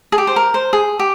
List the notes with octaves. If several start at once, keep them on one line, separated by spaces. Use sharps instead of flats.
G#4
G4
C5
A#4
C5
G#4
G4